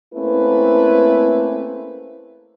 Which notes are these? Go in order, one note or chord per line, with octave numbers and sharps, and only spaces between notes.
A3 A#3 C4 C#4 E4 B4